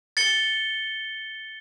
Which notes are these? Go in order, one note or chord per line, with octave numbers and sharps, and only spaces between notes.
A6 C#7 G7